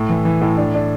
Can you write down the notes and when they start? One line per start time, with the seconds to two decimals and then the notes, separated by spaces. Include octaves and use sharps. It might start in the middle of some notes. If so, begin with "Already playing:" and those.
Already playing: A2
0.09 E3
0.25 E3
0.41 A2
0.57 D4
0.75 D4